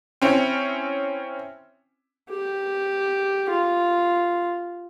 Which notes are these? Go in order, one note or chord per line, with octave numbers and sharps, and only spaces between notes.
C4 C#4 E4
G4
F4